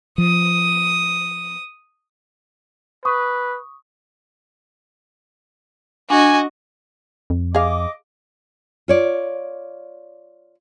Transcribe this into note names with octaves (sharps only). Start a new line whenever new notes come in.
F3 D#6
B4 C#6 D#6
D4 F#4 D#5 G#5
F2
G#4 D#5 F5 D6
F4 C#5 D5